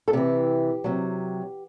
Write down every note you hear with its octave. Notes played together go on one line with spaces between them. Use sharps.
A4
C3 E3 G4
C3 F#3